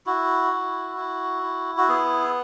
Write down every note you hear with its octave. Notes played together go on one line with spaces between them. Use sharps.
E4 F#4
E4
E4
E4
F#4
B3 G#4